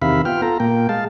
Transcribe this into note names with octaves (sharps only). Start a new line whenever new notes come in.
E2 C3 D#3 E5 F5 B5
B3 F4 G5 F6
F4 A4 A#5
A#2 A#3 G5
G#3 F5 A5